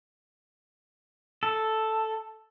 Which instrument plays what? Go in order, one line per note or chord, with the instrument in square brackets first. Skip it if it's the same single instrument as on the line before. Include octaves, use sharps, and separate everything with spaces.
[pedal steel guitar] A4